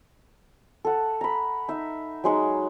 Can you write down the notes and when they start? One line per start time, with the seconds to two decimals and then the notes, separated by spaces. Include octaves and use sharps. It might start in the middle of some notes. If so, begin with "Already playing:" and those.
0.85 A4 F#5
1.21 A#5 B5
1.68 D#4 E5
2.24 F#3 G#3 D#4